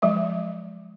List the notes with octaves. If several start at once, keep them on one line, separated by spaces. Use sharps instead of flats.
F3 F#3 G#3 E5